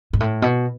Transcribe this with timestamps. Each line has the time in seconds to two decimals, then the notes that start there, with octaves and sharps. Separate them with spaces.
0.13 G#2
0.20 A2
0.42 B2